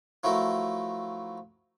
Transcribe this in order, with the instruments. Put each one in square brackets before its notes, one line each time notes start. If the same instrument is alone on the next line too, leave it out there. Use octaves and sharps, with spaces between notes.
[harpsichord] F3 F#3 A3 E4 A#4